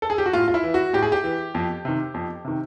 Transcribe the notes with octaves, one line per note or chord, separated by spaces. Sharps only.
A4
G#4
G4
F#4
A2 F4
F4
E4
E3
F#4
A2 G4
G#4
G4
E3
F2
C3 D#3
F2
C3 D#3